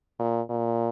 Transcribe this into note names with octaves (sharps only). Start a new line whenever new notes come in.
A#2
A#2